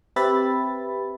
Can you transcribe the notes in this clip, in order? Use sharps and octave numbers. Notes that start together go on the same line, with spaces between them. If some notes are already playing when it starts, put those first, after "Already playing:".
C4 G4 B4 E5 B5 A6